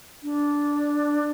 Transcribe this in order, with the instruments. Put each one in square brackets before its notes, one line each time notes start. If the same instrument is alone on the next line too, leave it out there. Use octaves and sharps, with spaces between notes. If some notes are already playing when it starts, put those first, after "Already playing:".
[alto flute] D4